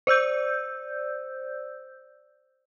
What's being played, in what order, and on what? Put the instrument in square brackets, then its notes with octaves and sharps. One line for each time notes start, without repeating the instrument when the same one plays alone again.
[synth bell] C5 D5 E6 G6